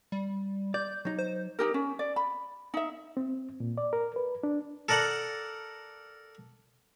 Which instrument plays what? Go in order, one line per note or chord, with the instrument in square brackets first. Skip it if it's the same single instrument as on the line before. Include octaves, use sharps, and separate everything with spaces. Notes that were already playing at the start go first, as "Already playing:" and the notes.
[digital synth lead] G3
[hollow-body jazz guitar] D5 [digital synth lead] G6
[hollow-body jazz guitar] F#3 D#4
[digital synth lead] C5
[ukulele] D#4 G4 A#4
C#4
D5
B5
D#4 E5
[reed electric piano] C4
A#2
D5
A#4
B4
D4
[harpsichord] A4 A#4 D5 F#5